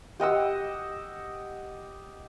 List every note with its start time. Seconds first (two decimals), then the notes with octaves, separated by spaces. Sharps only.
0.20 G4 D#5 F#5 E6